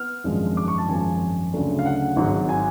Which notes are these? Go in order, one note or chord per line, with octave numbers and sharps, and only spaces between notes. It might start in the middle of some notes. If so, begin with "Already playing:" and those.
Already playing: B3 F6
G#1 F#2 F3 G#3 D4
D6
C#6
A5
G#1 F#2 F3 G#3 G#5
D2 C#3 F#3 A3 D4
F5
F#5
G#1 G#2 F#3
G#5